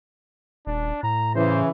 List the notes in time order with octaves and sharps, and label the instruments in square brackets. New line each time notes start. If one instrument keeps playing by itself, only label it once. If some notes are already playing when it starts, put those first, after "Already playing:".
[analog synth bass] D#1 [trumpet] D4
[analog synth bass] A2 [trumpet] A#5
[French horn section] C#3 E3 [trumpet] C5